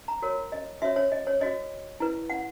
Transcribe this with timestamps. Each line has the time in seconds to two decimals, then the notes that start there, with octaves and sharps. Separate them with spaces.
0.08 A#5
0.22 F#4 A#4 C#5
0.52 D#5
0.82 F#4 C#5 E5
0.96 C#5
1.12 D#5
1.27 C#5
1.41 F#4 C#5 D#5
2.00 E4 B4
2.30 F#5